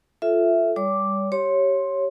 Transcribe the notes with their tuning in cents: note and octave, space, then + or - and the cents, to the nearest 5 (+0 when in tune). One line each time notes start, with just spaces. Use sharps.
F4 +0 A4 +0 E5 +0
G3 +15 C#5 +45 D6 +0
G4 -15 C#5 -10 C6 +10